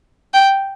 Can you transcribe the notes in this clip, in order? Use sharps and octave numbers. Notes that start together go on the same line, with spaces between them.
G5